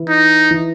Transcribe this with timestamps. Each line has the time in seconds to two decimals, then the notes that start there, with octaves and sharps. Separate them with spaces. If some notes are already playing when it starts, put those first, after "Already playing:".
Already playing: E3 E4
0.08 D#4
0.51 E3 E4